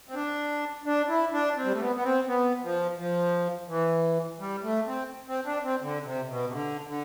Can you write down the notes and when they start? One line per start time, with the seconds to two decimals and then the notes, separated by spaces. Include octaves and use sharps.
0.09 C4
0.15 D4
0.86 D4
1.09 E4
1.33 D4
1.56 C4
1.65 G3
1.73 A3
1.80 B3
1.96 B3
2.04 C4
2.28 B3
2.62 F3
2.98 F3
3.69 E3
4.40 G3
4.64 A3
4.87 C4
5.28 C4
5.46 D4
5.64 C4
5.82 D3
6.05 C3
6.29 B2
6.48 C3
6.52 D3
6.87 D3